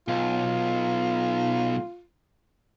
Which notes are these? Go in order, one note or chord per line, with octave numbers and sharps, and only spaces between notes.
B1 F4